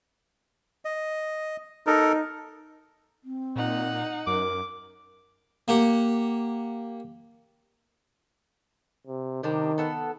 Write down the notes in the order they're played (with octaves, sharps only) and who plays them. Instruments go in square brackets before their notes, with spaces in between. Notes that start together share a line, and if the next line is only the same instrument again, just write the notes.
[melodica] D#5
[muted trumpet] D#4 [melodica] A4 A#4
[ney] C4
[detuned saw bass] A#2 [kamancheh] D#4 F#5
[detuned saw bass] F#2 [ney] A#4 [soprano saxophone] D6
[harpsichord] A#3 G4 F#5
[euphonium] C3
[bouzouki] C3 G3 D4 [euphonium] D#3
[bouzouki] B3 A4 F#5